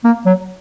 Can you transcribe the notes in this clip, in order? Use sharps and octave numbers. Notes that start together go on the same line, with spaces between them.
A#3
F#3